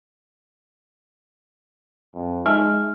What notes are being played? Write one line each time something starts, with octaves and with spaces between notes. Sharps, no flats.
F2
G#3 D#4 E5 G#5 A5 F6